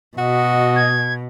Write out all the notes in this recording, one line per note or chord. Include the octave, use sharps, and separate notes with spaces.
B2 F#4 D#5
G#6